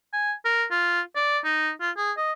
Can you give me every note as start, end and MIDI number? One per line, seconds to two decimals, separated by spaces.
0.13 0.33 80
0.45 0.65 70
0.71 1.01 65
1.16 1.39 74
1.45 1.71 63
1.81 1.91 65
1.97 2.12 68
2.17 2.32 75